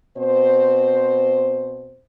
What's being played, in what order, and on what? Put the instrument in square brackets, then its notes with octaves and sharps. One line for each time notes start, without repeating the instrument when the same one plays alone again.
[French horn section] B2 C4 C5